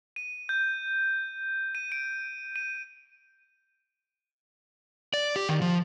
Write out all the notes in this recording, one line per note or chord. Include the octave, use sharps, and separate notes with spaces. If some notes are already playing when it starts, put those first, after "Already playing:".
D#7
G6
D#7
D7
D#7
D5
G4
D#3
F3